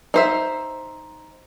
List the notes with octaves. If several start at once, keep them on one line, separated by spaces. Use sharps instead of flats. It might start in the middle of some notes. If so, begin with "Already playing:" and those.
D#4 C5 E5